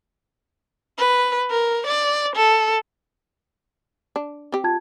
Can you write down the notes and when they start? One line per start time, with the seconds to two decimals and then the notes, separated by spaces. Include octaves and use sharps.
0.98 B4
1.50 A#4
1.87 D5
2.36 A4
4.16 D4
4.52 C4 G4
4.64 F4 A5 G#6